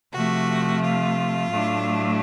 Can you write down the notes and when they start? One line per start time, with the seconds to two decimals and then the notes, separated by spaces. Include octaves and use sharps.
0.13 C3 F3 A3 F#4
0.81 F4
1.49 A2 F#3 A3 D4